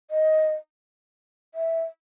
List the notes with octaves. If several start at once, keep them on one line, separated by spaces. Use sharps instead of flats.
D#5
E5